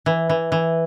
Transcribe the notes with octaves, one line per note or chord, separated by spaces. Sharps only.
E3
E3
E3